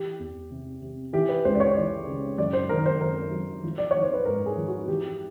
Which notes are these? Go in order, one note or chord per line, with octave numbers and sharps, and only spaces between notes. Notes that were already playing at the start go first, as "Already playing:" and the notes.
Already playing: E3 G4
E2
C3
C3
E3 G4
B4
C#2 C5
D5
C#5
E3 D5
C#3
F#2 D5
C5
D#3 A#4
C5
F#2 A#4
F#3
F3
D5
F3 C#5
C5
B4
G#2 A#4
G#4
F3
F#4
E3 G4